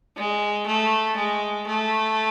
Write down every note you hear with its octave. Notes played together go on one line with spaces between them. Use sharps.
G#3
A3
G#3
A3